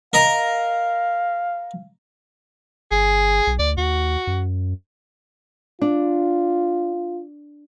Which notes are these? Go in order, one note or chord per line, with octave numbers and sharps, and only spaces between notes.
A#4 D#5 F5 A#5
G1 G#4
B1
D2 D5
D#2 F#4
F#2
D4 F4